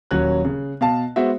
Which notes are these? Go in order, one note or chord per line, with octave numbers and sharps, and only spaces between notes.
D#1 F#3 C#4 F#6
C#3
B2 F5 A5
G#3 B3 F#4 C5 E5